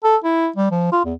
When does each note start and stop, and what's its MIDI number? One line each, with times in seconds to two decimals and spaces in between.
0.04 0.17 69
0.24 0.49 64
0.56 0.69 55
0.71 0.89 53
0.92 1.01 65
1.05 1.13 40